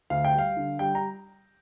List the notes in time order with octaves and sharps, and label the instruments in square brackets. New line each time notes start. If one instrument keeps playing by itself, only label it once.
[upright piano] D2 F5
G5
G3
F5
D3
G3 G5
A#5